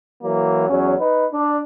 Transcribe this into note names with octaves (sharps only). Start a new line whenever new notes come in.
E3 F#3 A#3
E2 F#3 C#4
D#4 B4
D4